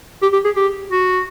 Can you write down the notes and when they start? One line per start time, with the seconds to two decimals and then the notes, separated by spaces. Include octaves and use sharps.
0.22 G4
0.33 G4
0.45 G#4
0.56 G4
0.90 F#4